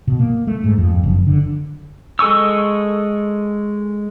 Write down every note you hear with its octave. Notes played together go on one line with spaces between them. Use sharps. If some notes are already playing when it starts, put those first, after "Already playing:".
B2
A#3
A3
G#2
F2
F#1
D3
G#3 A4 G#5 C#6 E6